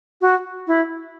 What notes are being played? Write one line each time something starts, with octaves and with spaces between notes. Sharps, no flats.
F#4
E4